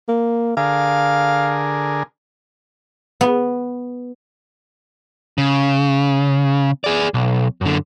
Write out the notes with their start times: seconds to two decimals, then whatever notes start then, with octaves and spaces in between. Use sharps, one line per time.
0.08 A#3
0.57 D3 G#4 A#4 F5
3.21 B3
5.38 C#3
6.84 G#4 D5
7.14 B1
7.61 F#2 D3